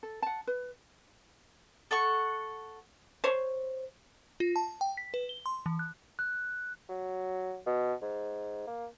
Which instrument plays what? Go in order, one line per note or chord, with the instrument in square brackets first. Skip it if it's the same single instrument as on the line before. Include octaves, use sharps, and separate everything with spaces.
[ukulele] A4
F#5 A5
B4
[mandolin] A4 F#5 C#6
[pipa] C5 C#5
[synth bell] F4
A5
G5
B6
B4
G7
C6
E3
F#6
[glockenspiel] F#6
[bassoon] F#3
B2
G#2
A#3